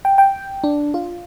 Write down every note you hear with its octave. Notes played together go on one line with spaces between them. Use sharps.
G5
G5
D4
F4